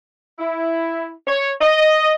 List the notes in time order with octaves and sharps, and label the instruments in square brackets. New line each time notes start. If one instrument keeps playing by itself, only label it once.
[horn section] E4
C#5
D#5